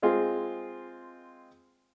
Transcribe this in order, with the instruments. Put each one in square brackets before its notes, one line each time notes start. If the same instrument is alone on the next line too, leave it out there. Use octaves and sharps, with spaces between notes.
[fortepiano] G#3 C4 F4 G#4